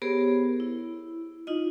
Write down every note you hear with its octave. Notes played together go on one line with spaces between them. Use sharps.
B3 G4 G#4 A#4 C5 C#5
E4
D#4 F4 D#5